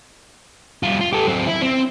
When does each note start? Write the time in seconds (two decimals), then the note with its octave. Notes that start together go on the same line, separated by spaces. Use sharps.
0.83 G3 F4
1.01 F4
1.13 G4 A4
1.27 F#3 C4
1.47 E4
1.62 C4